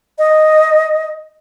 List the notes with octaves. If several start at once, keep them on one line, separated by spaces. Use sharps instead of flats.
D#5